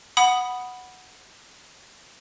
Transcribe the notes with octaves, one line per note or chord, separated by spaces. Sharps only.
F#5 B5 D#6